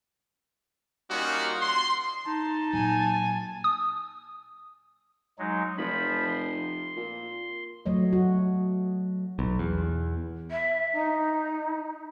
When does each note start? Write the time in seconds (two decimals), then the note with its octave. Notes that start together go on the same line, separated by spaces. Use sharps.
1.10 G3 A#3 C#4 D#4 F4 F#4
1.61 C6
2.27 D#4 A5
2.73 A#2 F#3 G#5
3.64 D#6
5.39 F#3 G#3 D#4
5.78 F1 F3 B5
6.29 C6
6.96 A#2
7.86 F#3 A3 C#5 D#5
8.13 F#4
9.39 B1
9.59 E2
10.51 E5
10.93 D#4